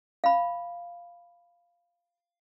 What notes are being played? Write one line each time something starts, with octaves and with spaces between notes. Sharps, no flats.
F5 B5